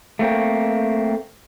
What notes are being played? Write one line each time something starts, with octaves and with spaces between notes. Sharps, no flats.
A3 A#3 C4